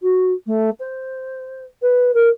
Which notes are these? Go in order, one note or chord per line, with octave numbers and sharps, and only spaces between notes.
F#4
A3
C5
B4
A#4